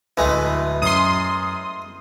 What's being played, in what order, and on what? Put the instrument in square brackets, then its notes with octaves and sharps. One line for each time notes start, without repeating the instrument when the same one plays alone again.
[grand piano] D1 B4 G#5 [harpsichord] E3 G#3 A3
[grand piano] F#2 [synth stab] C6 D#6